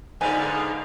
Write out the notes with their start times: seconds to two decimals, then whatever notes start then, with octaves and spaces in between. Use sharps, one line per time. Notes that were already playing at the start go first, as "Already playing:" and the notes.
0.21 G#2 D3 B3 D#4 B4 D5 F5 G#5